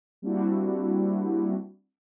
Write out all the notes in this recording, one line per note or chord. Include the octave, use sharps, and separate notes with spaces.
G3 A#3 C4 D4 E4 F#4